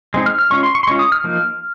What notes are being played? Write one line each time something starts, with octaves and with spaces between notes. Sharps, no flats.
G#3 C4 D#4
F6
F6
G#3 C#4 F4 C#6
C6
C#6
C6
G#3 C#4 F4 C#6
D#6
F6
F3 A#3 D#4